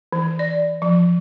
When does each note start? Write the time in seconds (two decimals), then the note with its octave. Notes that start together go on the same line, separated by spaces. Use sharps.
0.13 E3
0.39 D5
0.82 F3